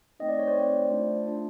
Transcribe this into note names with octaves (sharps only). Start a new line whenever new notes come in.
A3 C4 D#4 D#5
D5
C#5
C5 D5
A3 C4 D#4
A3 D4 F4
A3 D4 F4